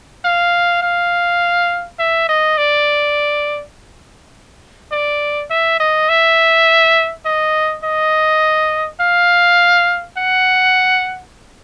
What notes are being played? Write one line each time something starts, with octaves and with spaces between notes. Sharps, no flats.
F5
F5
E5
D#5
D5
D5
E5
D#5
E5
D#5
D#5
F5
F#5